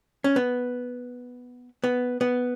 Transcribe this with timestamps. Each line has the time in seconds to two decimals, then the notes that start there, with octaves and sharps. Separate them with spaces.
0.24 C#4
0.36 B3
1.84 B3
2.21 B3